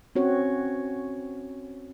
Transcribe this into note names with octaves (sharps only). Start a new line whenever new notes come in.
C4 C#4 F#4 C#5